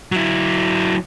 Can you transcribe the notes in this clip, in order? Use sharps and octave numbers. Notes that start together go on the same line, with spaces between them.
F#3 E4